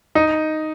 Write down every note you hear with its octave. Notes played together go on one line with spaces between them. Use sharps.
D#4